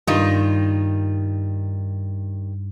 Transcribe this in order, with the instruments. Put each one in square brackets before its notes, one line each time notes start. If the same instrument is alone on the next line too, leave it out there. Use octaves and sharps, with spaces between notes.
[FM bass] G2 [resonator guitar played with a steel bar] D#3 G3 F4